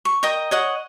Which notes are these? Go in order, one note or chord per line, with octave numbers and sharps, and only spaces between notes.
C#6
A#4 D#5 G5 D#6
C#5 D#5 F#5